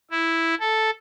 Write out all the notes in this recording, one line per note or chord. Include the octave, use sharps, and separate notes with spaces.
E4
A4